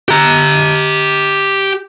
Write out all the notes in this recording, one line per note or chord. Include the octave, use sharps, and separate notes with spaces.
G4 A#5